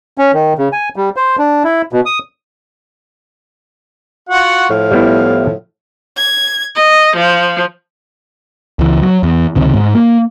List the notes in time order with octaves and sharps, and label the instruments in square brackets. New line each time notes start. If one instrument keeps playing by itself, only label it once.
[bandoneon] C#4
D#3
C#3
G#5
G3
C5
D4
E4
B2
D#6
[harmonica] F4 F#4 F#5
[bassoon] A2 [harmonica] F3 F5
[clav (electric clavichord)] G3 B3 E4
[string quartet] G#6
D#5
F3
[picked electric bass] C#2 E3
F#3
E2
C#2 C3 D#3
G#2
A#3